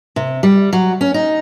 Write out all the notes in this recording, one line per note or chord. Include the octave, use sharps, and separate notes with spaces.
C3
G3
F#3
C#4
D#4